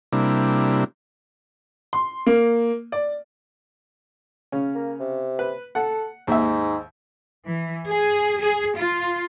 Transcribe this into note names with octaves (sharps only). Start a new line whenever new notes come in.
C3 G3 A#3 D4 E4
C6
A#3
D5
C#3 C#4
A#3
C3
B4
A4 F#5
D#2 G#2 E5
E3
G#4
G#4
F4